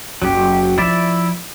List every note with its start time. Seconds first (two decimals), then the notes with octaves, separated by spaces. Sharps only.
0.22 F#1 F#3 C#4 G4
0.78 F3 E4 D5 E5